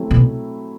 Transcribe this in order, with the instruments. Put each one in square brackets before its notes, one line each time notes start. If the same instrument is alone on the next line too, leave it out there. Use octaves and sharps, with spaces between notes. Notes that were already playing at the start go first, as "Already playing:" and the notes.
Already playing: [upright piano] F#3 A3 C4 E4 G4
[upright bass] B2